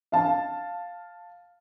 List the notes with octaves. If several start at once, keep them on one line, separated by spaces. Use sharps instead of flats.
F5 A5